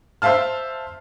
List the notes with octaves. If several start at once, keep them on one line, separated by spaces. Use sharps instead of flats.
C5 E5 F5 A5 F6